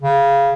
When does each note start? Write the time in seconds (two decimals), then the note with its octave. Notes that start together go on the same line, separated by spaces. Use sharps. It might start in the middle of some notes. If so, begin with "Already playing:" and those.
0.02 C#3